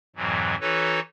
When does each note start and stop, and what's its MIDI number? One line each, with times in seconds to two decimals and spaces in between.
0.16 0.55 41
0.16 0.55 44
0.16 0.55 47
0.16 0.55 52
0.16 0.55 54
0.61 1.00 52
0.61 1.00 63
0.61 1.00 66
0.61 1.00 69
0.61 1.00 71
0.61 1.00 73